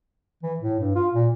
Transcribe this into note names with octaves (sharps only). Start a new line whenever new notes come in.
E3
A2
G2
F4
A#2